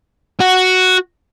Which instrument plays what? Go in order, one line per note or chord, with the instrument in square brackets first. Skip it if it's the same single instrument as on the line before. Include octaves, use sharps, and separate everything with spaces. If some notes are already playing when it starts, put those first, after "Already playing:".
[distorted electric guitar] F#4